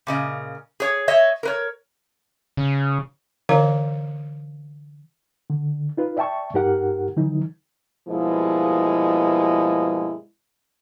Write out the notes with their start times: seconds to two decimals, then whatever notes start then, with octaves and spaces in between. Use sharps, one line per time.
0.07 A#2 C#3 D#5
0.80 G#4 C#5
1.08 C#5 D#5 E5
1.43 A#4 B4 C#5
2.57 C#3
3.49 D3 E3 A#4 C#5 F5 A#5
5.50 D3
5.97 D#4 F4 B4
6.17 D5 E5 G5 A5 C#6
6.54 G2 D#4 G4 A#4 F#5
7.16 D3 E3 F#3 D#4
8.08 G2 B2 F3 G#3 A#3 E4